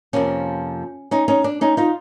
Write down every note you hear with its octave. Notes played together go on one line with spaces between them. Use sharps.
F2 C3 F3 A#3 C#4
C#4 D#4
C#4 D#4
D4
C#4 D#4
D#4 F4